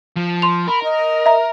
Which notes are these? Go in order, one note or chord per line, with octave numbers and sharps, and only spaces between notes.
F3
C6 F7
A#4 B5
D#5
E5 A#5